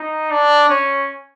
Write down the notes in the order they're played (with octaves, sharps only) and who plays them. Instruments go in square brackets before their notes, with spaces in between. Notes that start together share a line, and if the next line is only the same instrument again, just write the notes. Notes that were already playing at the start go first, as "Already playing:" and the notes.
Already playing: [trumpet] D#4
D4
C#4